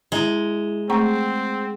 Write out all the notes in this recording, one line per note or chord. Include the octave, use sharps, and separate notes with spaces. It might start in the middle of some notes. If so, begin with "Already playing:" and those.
G#3 E4 E5 A#5
A3 C4 G#4 F#5 G5 A#5 C#6